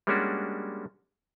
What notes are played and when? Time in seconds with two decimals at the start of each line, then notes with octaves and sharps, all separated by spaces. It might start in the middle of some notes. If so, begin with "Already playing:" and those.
0.07 G3 G#3 A#3 C#4 D4 F#4